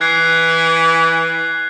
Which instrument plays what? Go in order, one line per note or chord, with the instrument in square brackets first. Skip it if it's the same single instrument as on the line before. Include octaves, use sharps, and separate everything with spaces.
[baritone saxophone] E3 [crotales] F#6 G#6 C7